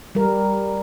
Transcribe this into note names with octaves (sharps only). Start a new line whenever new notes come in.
G3 A#4